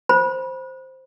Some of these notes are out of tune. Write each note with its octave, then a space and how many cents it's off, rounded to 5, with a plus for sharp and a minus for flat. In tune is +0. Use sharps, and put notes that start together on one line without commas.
C5 +0 B5 -25